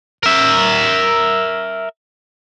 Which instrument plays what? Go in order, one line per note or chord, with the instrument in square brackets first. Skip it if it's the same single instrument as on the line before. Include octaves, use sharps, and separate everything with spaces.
[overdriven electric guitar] A#4 E5